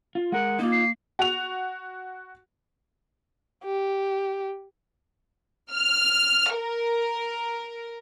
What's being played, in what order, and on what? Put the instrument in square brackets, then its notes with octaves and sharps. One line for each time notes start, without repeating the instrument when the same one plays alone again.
[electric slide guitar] F4
[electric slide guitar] G#3 A#4 [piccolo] F#5
[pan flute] A#3 [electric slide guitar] D#4 F4
[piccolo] C7
[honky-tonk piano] F#4 F7
[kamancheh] G4
[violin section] F6
A#4